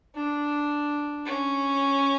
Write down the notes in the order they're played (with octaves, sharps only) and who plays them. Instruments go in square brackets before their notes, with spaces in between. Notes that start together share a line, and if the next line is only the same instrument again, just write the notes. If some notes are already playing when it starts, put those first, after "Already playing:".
[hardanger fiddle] D4
C#4